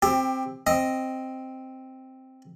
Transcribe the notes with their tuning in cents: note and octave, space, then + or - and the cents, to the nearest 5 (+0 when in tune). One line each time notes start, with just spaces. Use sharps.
C4 +0 G4 +20
C4 +0 D#5 +0